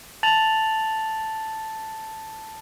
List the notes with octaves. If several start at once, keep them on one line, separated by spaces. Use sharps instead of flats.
A5 A6 F7 F#7